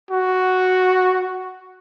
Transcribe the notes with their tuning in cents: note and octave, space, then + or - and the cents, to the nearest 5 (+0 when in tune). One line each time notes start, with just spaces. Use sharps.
F#4 +0